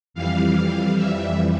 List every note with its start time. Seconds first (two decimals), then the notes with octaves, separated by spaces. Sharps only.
0.14 F2 E3 G3 F5
0.54 F5
0.96 E5